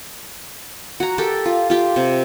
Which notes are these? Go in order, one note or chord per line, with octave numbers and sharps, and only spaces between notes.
F#4 A#5
G4 A4 A#4
F4
F4 G4
C3